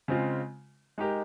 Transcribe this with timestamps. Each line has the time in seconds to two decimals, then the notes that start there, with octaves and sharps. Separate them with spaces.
0.08 C#3 G#3 C4 F4
0.98 G#3 D#4 G4 A#4